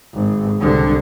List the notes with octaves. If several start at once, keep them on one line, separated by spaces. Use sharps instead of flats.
G#1
C2 D3